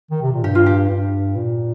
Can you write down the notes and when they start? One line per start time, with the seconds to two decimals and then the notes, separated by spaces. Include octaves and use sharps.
0.11 D#3
0.22 C3
0.33 A#2
0.43 G2 G4
0.55 F4
0.66 G4
0.90 G2
1.36 A#2